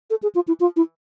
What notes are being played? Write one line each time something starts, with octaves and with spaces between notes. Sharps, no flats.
A4
G#4
F4
E4
F4
E4